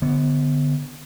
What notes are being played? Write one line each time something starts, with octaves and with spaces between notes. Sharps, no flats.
D3 B3